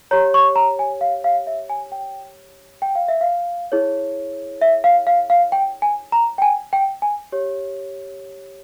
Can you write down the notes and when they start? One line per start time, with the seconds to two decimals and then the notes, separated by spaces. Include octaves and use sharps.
0.11 G4 C#5 A#5
0.34 C#6
0.56 A#5
0.79 G#5
1.01 F5
1.24 F5
1.47 E5
1.69 G#5
1.92 G5
2.82 G5
2.95 F5
3.08 E5
3.21 F5
3.72 E4 G#4 C#5
4.62 E5
4.84 F5
5.07 F5
5.30 F5
5.52 G5
5.82 G#5
6.12 A#5
6.38 G5
6.42 G#5
6.73 G5
7.02 G#5
7.32 G4 C#5